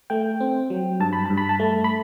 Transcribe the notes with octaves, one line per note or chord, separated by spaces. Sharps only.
A3 G5
C4
F#3
G2 A5
B5
G2 A5
B5
A5
A3
B5